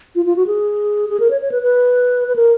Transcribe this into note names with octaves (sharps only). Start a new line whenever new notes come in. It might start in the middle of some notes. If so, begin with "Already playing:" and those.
F4
F4
F#4
G#4
G#4
A#4
C#5
C#5
B4
B4
B4
A#4